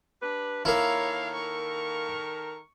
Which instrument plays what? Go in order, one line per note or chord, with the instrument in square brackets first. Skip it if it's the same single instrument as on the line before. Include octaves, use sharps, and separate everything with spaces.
[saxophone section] D4 G4 B4
[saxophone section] D#3 A4 A#4 [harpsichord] A#3 E4 [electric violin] C#5 F5
[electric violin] C#6